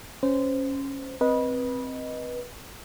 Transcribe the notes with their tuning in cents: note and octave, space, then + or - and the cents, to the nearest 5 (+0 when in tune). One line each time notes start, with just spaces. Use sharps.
C#4 -10 C5 -20
C4 +0 B4 -20 D#5 +0